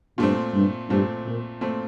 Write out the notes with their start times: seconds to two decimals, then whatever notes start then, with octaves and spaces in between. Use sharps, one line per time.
0.18 G2 A#2 A3 C4
0.54 G2
0.90 G2 A#2 A3 C4
1.26 A#2
1.61 A#2 A3 C4